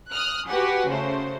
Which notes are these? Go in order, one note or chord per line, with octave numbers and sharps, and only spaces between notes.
D#6 F6 F#6
F#4 G4 B4 F#5 G#5
C#3 A3 F#4 C5